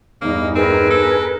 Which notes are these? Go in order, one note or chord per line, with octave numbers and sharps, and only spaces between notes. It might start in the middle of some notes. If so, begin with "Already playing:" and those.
E2 G2 A#3 D#4
C4 G#4 A#4 B4
A4